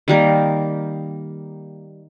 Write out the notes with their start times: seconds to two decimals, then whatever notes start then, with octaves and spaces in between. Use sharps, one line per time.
0.08 D#3 G3 A#3